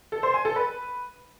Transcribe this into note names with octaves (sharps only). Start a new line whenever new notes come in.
A4
C5
G#5
A4
B4